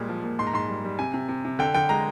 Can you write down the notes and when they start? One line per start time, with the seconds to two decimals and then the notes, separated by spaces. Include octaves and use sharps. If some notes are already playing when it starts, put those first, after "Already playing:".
Already playing: A#2 G3 G#3
0.09 F3
0.24 A#2
0.39 G#2 C6
0.47 A#5
0.54 G#2 C6
0.69 G3
0.84 G3
0.99 C3 G#5
1.14 C3
1.29 C3
1.45 C3
1.59 D3 G5
1.74 D3 G5
1.89 G#3 A#5